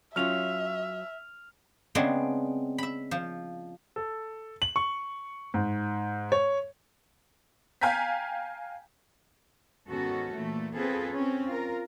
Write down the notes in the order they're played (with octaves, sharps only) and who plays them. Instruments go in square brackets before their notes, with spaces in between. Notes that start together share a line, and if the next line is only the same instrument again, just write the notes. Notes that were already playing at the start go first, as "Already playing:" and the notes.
[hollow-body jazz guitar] F#3 C#4 F4 [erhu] E5 [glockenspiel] F6 F7
[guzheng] C#3 G#3 B3 C4 D4
E5 B5
F3
[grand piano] A4
F#7
C#6
G#2
C#5
[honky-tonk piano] F5 G5 G#5 A#5 G6 B6
[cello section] G#2 D#3 B3 C#4 F#4 A4
A#2 E3 A3
B3 C4 F4 G#4 A4 B4
C4 C#4
F4 A#4